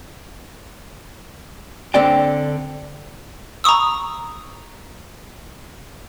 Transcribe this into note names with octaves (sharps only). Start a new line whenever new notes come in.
D3 C4 D5 G5
A#5 B5 C#6 D#6 E6